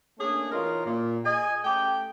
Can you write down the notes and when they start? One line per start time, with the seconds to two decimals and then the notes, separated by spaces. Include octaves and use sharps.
0.19 A3 A#3 C#4 D4 G#4
0.52 B2 E3 C#4 D#4 F4 A#4
0.85 A#2
1.25 G#4 D#5 G#5
1.65 A3 C#4 G4 G5